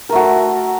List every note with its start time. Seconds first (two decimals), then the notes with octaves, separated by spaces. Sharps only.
0.09 A#4
0.12 A3
0.15 F#4